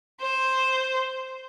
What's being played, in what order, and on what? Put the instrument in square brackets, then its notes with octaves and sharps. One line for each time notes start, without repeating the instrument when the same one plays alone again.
[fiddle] C5